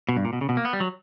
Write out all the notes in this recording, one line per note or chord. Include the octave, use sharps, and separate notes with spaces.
B2
G2
A#2
B2
C#3
B2
A#3
B3
G3
F#3